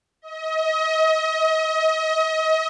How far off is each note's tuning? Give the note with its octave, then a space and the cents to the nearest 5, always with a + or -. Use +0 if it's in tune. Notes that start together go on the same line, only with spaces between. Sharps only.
D#5 +35